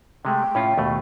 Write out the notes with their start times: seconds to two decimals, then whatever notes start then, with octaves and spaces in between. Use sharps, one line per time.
0.25 C3 G#3 A3 G5
0.55 A2 C#4 F4
0.78 D#2 B2 A3